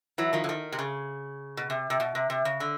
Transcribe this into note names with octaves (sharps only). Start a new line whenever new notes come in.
E3 F#3
D#3 F3
D3
D#3
C3
C#3
B2
C3
C3
B2
C3
C3
C#3
D3